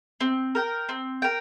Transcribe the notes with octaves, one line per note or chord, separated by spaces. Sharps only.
C4
A#4 G5
C4
A#4 G5